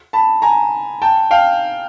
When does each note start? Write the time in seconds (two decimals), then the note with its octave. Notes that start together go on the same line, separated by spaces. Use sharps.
0.13 A5 B5
0.42 G#5 A#5
1.02 G5 A5
1.31 F5 G5